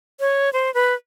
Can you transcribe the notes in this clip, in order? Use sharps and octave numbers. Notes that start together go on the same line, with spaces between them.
C#5
C5
B4